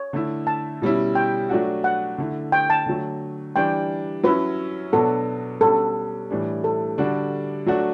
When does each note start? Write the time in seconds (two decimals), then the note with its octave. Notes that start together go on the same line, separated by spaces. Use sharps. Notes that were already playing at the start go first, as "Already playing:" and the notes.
Already playing: C#5
0.13 D3 A3 E4
0.47 A5
0.82 B2 G3 C#4 E4
1.15 G5
1.49 F#3 A3 D4 F#4
1.84 F#5
2.18 D3 A3 E4
2.52 G5
2.70 A5
2.86 D3 F#3 A3
3.56 E3 G3 D4 G5
4.23 F#3 C#4 E4 B4
4.92 B2 F#3 B3 D4 F#4 A4
5.61 B2 G3 C#4 F#4 A4
6.30 A2 E3 G3 D4
6.64 A4
6.98 D3 G3 D4 F#4
7.66 F#3 A3 D4 F#4